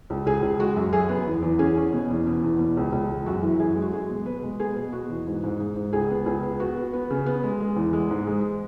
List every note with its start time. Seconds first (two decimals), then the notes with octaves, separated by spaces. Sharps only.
0.10 C#2
0.26 C#2 G#4
0.42 C#2
0.59 G#3 F#4
0.76 F#2
0.93 F#2 G#4
1.09 B3
1.27 E2
1.42 E2
1.59 C#4 G#4
1.77 C#4
1.93 B2
2.10 E2
2.27 B2
2.42 E2
2.59 B2
2.77 C#2
2.92 C#2
3.09 G#3
3.26 F#2 F#4
3.43 E3
3.60 F#2 G#4
3.76 G#3
3.82 F#4
3.92 G#3 G#4
4.10 B2
4.26 B2 B4
4.43 G#3
4.59 B3 G#4
4.76 B2
4.92 B2 F#4
5.10 E2
5.27 G#2
5.44 G#2
5.60 G#2
5.76 G#2
5.93 C#2 G#4
6.10 B3
6.26 C#2 G#4
6.43 B3
6.60 B3 F#4
6.77 B3
6.93 B3
7.10 C#3
7.26 B3
7.43 G#3
7.60 G#3
7.76 E2
7.93 G#3
8.11 G#2
8.27 G#3